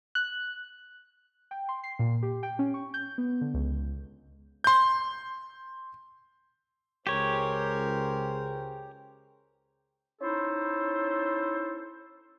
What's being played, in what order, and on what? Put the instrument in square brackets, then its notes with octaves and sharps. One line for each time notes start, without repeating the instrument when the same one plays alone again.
[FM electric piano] F#6
[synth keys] G5
C6
C7
A#2
G4
G5
C#4
C#6
G6
B3
D3
C#2
[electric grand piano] C6 G6
[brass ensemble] C#2 G#4 C5 [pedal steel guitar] G4 C#5 [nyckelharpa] A#4
[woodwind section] C#4 D#4 E4 A4 C5